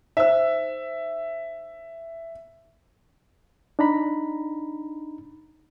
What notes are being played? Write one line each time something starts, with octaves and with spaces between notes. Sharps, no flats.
D#4 C5 E5 E6
D4 D#4 A#5 B5